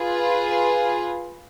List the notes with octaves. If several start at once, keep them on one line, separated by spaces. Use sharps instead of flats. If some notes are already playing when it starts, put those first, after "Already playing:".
Already playing: F4 G#4 B4